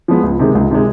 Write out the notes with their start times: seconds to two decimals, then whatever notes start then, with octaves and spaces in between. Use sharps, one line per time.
0.08 F3 G#3 B3
0.23 C#2
0.39 C3 D#3 G#3
0.55 C#2
0.71 C3 D#3 G#3